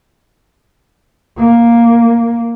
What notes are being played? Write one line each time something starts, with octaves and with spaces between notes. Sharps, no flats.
A#3